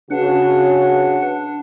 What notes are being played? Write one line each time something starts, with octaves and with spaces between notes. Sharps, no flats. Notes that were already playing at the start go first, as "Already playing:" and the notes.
C#3 D4 F#4 B4 F#5